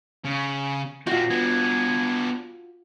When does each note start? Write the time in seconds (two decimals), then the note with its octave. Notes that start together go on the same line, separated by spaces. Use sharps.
0.25 C#3
1.07 A#2 C4 F4 F#4
1.30 B3 D4 G#5